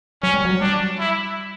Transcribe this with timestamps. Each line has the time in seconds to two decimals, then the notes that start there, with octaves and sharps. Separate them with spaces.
0.23 F#3 C#4
0.34 G3
0.45 F#3
0.61 G3 D4
0.99 E4